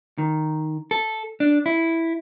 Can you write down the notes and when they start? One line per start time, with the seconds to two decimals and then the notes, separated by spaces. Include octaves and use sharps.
0.18 D#3
0.91 A4
1.40 D4
1.66 E4